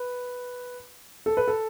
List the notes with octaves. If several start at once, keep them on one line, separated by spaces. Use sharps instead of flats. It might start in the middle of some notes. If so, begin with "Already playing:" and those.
Already playing: B4
A4
B4
A4